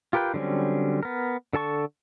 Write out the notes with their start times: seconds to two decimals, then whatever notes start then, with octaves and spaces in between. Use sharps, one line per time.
0.13 F4 G4 A#4 B4 G5
0.34 D3 F#3 G3 C4 C#4
1.03 B3 A#4
1.53 D3 A4 A5 C#6